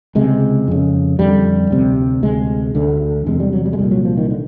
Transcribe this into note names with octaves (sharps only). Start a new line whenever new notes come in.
C#2 C3 G#3
F2 C#3
F2 D3 G3
D2 C3
D2 C3 G#3
D2 D3 A3
E2 C3 G#3
G3
F#3
G3
G#3
C2 A#2 G3
F#3
F3
D#3
D3